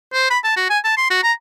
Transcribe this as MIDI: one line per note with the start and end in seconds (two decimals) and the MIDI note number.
0.14 0.28 72
0.31 0.39 83
0.45 0.56 81
0.57 0.70 66
0.70 0.79 80
0.85 0.95 81
0.98 1.07 84
1.10 1.19 66
1.23 1.33 82